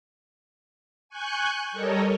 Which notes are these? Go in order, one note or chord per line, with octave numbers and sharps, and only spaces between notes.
G#5 C#6 F#6 G6
G3 A4 A#4 C#5 D#5